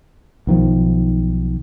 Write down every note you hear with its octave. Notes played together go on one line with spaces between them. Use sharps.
B1 D#3 F3